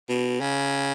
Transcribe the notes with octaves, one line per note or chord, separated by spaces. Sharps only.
B2
C#3